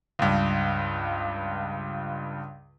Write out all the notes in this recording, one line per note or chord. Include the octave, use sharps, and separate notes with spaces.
C#2 G2